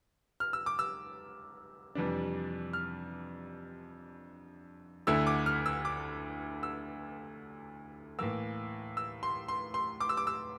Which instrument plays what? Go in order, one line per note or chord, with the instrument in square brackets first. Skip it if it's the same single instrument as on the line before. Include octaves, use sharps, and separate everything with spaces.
[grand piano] F6
E6
D6
E6
F2 C3 E3 G3 D4
F6
D2 D3 A3 E4 E6
D6
F6
E6
D6
E6
A2 E3 A#3 E6
E6
C6
C6
C6
D6
E6
D6
E6